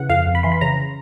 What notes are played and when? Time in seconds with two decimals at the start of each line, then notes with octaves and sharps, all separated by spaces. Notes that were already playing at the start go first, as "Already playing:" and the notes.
Already playing: C#3 E3 F#5
0.09 F2 F5
0.27 F2
0.35 B5
0.43 E3 C6
0.52 B5
0.61 C#3 A#5